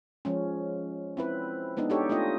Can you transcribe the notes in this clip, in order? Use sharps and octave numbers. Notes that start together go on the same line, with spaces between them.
F3 G#3 C#4
C4 E4 B4
G#3 B3 D4 D#4
D4 D#4 G4 A4 C#5
A3 D4 F4 D#5